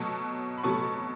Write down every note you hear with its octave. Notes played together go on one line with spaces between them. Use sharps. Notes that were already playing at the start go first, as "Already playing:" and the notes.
Already playing: B2 F#3 A3 A5 C#6
B5
B2 F#3 A3 A5 C#6